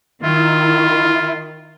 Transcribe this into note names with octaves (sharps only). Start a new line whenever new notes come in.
D#3 E4 F4